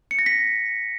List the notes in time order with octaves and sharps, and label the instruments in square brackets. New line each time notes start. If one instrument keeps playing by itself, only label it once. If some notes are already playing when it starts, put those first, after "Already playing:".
[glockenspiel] C#7
A#6
B6